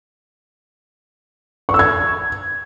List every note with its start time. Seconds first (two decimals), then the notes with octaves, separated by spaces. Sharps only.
1.69 C#6
1.74 E6
1.79 G#6